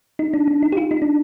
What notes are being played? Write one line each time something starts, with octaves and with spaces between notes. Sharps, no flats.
D#4
D4
D4
D#4
G4
F4
D#4
D4